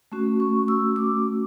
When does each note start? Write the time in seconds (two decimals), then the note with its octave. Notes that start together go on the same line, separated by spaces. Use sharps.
0.12 A3 C#4 F#4
0.40 C#6
0.68 E6
0.96 D6